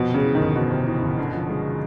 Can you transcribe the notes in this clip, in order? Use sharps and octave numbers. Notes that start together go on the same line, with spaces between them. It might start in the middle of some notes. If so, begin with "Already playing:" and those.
Already playing: F2 B2
C3
C#3
E3
G1 D#3
F2 B2
C3
E3
G1
D3
F3
G#3